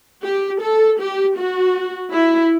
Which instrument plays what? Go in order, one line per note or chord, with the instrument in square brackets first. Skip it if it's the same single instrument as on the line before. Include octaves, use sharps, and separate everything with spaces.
[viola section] G4
A4
G4
F#4
E4